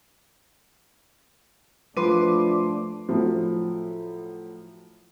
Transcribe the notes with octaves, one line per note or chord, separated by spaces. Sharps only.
F3 A3 D4 B4 C6 D6 D#7
A2 F3 F#3